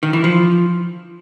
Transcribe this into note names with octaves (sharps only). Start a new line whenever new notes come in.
D#3
E3
F3